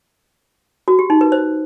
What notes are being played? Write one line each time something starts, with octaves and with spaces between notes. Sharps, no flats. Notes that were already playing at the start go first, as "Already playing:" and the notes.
F#4
G4
D#4
B4
C5